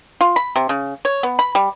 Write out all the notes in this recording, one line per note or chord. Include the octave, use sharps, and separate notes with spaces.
F4
B5
C3
C#3
C#5
B3
B5
G3